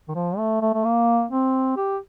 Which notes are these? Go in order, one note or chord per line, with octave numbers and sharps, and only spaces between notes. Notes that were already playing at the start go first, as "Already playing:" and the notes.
D#3
F3
A3
A3
A3
A#3
C4
G4